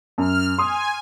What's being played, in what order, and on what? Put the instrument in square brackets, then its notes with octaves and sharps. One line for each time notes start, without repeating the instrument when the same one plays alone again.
[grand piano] F#2 [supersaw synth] F6
[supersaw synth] G#5 [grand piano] C6 D#6